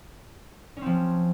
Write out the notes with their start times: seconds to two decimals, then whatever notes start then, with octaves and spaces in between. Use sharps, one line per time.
0.77 C#4
0.81 C4
0.86 F3